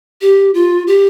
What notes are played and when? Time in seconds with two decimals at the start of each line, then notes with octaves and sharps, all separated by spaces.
0.21 G4
0.54 F4
0.87 G4